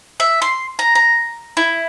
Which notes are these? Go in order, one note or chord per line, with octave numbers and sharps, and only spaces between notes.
E5
C6
A#5
A#5
E4